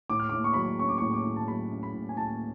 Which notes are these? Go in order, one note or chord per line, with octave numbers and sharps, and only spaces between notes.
A2 D6
F6
A2 D6
C#6
F#3 B5
C#6
C#4 C#6
D6
A2 C#6
D6
A2
A5
F#3 B5
C#4
B5
A2
G#5
A2 A5